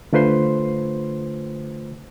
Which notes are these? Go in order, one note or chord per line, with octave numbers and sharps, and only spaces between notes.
D3 A3 F4 B4 C5 C6